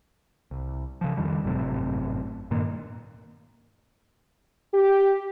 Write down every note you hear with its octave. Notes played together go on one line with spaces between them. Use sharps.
C2
C#3 F3
F2 D#3 G3
G#1 F#2 A2 C3
G2 A#2 D#3 A#3
G4